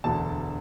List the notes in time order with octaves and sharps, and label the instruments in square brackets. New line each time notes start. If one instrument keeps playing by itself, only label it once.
[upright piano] E1 D2 D3 A5